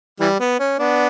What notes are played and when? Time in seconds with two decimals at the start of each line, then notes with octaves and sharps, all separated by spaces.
0.20 E3 G3
0.40 B3
0.60 C#4
0.79 B3 D4